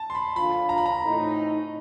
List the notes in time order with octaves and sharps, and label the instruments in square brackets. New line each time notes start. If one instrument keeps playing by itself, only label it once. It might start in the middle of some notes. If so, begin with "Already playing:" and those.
Already playing: [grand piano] A5
C6
B5
[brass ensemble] D3 F3 A#3 D4 F4 [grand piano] B5
[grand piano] A#5
B5
A#5
[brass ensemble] A2 E3 A3 C4 D#4